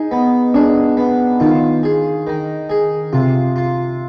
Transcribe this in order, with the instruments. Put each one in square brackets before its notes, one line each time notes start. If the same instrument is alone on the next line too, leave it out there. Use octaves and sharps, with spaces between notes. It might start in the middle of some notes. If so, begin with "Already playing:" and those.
Already playing: [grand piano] D#4 [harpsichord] G#4
[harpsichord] B3
[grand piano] D4 [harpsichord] G#4
[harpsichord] B3
[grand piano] D#3 [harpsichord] F4
[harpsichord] G#4
D#3
G#4
[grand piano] C3 [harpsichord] F4
[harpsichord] F4